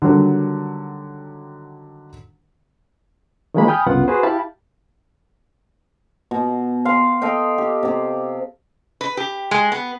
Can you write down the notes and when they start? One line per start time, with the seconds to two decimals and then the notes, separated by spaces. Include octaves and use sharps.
0.02 D3 D#3 F#3 G3
3.54 D#3 F3 F#3 G#3 A#3 B5
3.68 G5 G#5 B5 D#6 F6 G6
3.86 C2 F#2 C#3 B3 F4 F#5
4.08 F#4 G#4 B4 C5
4.23 E4 G4 F5 A5 B5
6.31 B2
6.85 F5 G5 C6
7.22 A4 D#5 F5 G5
7.58 G4
7.83 C3 G4
9.01 B4
9.17 G4
9.51 G#3
9.72 B3